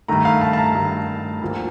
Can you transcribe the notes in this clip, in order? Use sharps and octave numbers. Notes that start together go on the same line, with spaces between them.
G2 D#3 A3 A#5
F5
A5
A5
A#5
G2 D#3 A3
D2 D3 F3 A#3